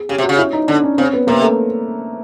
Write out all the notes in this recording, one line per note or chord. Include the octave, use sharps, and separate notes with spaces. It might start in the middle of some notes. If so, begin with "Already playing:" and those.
Already playing: G#4
C#3 G4
C3
F#4
C#3
E4
D#4
D3 D4
C#4
C#3 C4
B3
C3 A#3
A3